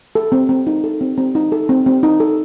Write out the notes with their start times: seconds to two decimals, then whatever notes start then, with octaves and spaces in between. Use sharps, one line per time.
0.15 A4
0.32 C4
0.49 C4
0.67 D#4
0.84 A4
1.01 C4
1.18 C4
1.35 D#4
1.52 A4
1.69 C4
1.86 C4
2.03 D#4
2.20 A4